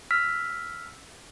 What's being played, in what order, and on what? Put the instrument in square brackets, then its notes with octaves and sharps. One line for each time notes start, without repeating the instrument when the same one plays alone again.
[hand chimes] E6 F6 B6